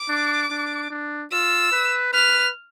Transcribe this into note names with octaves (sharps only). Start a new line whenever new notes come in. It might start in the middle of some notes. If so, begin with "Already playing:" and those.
Already playing: D6
D4
D4
D4
F4 E6
B4
B4 F6